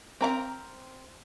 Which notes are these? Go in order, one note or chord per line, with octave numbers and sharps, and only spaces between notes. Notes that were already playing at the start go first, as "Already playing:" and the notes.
C4 A#4 F5 A#5